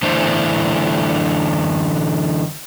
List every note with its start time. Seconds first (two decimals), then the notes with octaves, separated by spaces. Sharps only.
0.02 D3 E3 A3 D4 E4 C5